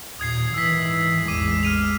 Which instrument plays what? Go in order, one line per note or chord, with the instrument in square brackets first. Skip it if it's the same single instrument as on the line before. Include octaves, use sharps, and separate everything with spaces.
[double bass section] D#2 A#2 [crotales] D#6 G#6 C7
[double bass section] G#2 D#3 E3 [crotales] E6 B6
[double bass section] A1 E2 G#3 [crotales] D6 D#7
[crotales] F6 D#7 F7